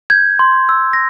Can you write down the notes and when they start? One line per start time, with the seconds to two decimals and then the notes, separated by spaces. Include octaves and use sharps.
0.10 G6 G#6
0.39 C6
0.69 E6
0.93 A#6